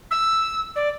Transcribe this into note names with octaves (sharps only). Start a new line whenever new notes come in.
E6
D5